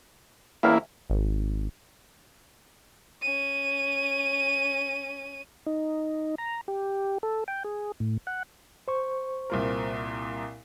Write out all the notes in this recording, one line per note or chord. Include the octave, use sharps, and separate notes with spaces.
A1 E2 A#3 E4 F5
G#1
C#4 D#7
D#4
A#5
G4
A4
G5
G#4
A2
F#5
C5 C#6
C2 A#2 A#4